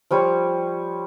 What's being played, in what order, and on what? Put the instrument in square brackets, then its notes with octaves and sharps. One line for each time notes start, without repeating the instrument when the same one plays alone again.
[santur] F3 G3 C#5